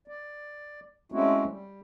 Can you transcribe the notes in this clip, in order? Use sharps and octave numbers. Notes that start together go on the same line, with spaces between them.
D5
G#3 A3 C4 C#4 E4 F#4
G3